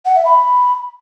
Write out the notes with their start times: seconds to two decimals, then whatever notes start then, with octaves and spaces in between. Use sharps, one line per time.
0.06 F#5
0.15 E5
0.25 B5